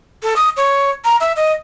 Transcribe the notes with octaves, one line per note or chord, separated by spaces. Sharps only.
A4
D#6
C#5
A#5
E5
D#5